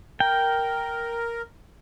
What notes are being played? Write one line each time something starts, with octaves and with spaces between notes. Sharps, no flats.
A#4 G5